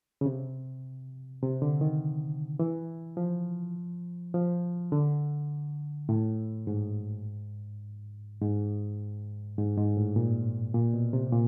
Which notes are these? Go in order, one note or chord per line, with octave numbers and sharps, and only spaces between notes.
C#3
C3
C3
D3
D#3
E3
F3
F3
D3
A2
G#2
G#2
G#2
G#2
A2
A#2
A#2
B2
C3
A#2